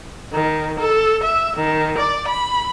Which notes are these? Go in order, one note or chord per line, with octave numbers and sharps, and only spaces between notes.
D#3
A4
E5
D#3
D5
B5